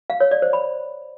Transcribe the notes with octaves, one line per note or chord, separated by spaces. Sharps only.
F5
C#5
D5
C5
B5